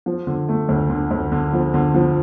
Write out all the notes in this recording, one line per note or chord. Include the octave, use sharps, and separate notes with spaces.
F3
D3
A3
D2
D3
D2
D3
F3
D3
F3